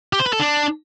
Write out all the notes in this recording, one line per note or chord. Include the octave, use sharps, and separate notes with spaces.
G4
C5
B4
A4
D4